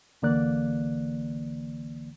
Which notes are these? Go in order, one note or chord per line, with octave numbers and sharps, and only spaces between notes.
C2 D3 E3 A#3 D5 F#6